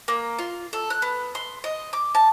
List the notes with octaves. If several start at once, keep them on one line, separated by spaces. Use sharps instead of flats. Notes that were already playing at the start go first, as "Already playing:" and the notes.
A#3
F4
A4
F#6
B3
C6
D#5
D6
A5